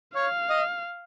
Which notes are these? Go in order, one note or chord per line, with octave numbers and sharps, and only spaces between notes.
C#5 F5
D#5